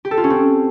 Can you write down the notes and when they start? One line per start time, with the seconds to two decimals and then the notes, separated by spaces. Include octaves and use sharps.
0.05 G4
0.11 A4
0.17 F4
0.24 C#4
0.30 C4